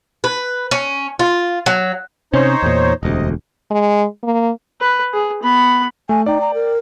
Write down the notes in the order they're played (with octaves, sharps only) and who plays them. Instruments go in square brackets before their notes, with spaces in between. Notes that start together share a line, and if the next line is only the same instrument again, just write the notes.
[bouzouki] B4
C#4
F4
F#3
[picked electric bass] C3 C#4 [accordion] D#4 C5 C#5
[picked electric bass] E2 A#2
[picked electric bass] E1 D2 [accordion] C3 D#5
[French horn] G#3
A#3
[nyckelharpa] B4
G#4
B3 B5
[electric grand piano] A3 [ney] G#5
[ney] D#4 [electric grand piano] D5 G5
[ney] A#5
A#4